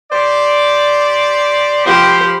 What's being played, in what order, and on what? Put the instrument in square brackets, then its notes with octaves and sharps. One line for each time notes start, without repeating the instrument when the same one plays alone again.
[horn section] G4 C5 D5
[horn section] F3 B5 [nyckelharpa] G4 C5